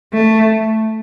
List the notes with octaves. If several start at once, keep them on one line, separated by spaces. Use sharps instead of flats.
A3